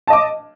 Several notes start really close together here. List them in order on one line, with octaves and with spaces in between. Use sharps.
A5 D#5 D6